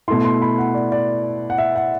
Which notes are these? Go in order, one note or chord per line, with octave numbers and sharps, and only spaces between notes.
B2 A3 E4 C6
C6
B5
F#5
D5
D5
F#5
E5
F#5